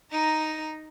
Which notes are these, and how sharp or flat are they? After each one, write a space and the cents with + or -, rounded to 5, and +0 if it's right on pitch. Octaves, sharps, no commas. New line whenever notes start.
D#4 +0 A#5 +0